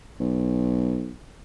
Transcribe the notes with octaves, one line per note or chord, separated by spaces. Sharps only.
B1